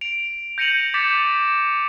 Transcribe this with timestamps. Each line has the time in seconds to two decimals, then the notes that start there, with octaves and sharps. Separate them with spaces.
0.01 D7 F7
0.58 G6 A#6 C#7 D#7 F7 F#7
0.94 D6 G6 A6 B6 C#7 E7